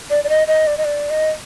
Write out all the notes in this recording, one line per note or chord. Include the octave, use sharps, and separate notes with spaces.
D5
D5
D#5
D#5
D5
D#5
D5
D#5